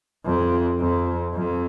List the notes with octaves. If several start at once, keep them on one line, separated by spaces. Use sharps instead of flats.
F2
F2
F2